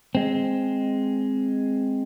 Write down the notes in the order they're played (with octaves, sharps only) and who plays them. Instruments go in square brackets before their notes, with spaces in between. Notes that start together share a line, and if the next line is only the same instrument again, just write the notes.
[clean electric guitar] G#3 C4